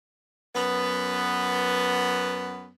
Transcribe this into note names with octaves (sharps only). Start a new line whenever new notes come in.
F#2 B3